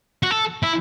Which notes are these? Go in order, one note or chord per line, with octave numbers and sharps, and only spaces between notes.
F#4
A4
E4